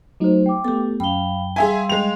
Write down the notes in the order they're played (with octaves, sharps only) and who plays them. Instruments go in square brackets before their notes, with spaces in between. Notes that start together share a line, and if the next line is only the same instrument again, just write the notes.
[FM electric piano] F#3 A3 D#4 [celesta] A4 C5
[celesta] G5 D6
[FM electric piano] A3 B3 [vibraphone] G4 A4
[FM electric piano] F#2 [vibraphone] F5 B5 [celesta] G5 G7
[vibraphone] G3 F5 C6 [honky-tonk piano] G#4 E5 G#5
[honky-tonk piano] G#3 F7 [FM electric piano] G5